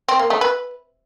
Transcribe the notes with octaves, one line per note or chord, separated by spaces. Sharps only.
C4
A#3
A3
B4